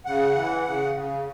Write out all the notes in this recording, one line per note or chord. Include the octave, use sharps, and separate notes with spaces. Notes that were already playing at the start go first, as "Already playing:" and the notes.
C#3 F#5
E3
C#3
C#3